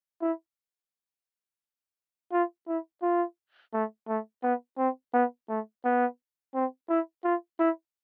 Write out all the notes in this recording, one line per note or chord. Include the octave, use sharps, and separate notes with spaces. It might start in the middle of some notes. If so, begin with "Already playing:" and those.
E4
F4
E4
F4
A3
A3
B3
C4
B3
A3
B3
C4
E4
F4
E4